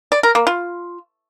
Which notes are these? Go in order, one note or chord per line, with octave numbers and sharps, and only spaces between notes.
D5
A#4
A#3
F4